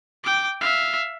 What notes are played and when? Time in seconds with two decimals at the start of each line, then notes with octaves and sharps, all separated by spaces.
0.24 G5 D6
0.61 E5 F5